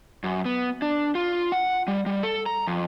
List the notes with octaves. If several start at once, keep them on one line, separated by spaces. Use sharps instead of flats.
F#2
B3
D4
F4
F#5
G3
G3
A4
A#5
F2